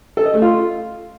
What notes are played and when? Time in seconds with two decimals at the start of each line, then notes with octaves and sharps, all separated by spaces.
0.17 A4
0.25 D#5
0.34 A3
0.42 F4